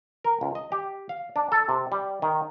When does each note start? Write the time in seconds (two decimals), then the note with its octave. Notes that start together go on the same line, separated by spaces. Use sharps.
0.24 A#4
0.41 C#2
0.55 D#5
0.72 G4
1.09 F5
1.36 D4
1.52 A4
1.69 C3
1.92 G3
2.22 D#3